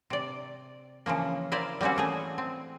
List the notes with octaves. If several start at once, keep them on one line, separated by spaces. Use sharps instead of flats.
C3 D5
C#3 E3 F3 A#3
E4 A#4 C5 D5 F5
G3 A#3 C4 C#4 F#4
E3 A3 G#4
C4